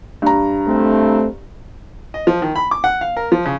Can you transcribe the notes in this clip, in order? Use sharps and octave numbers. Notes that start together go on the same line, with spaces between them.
G2 A#5
A3 C4
D#5
F3
D#3
B5
D6
F#5
F5
A#4
F3
C#3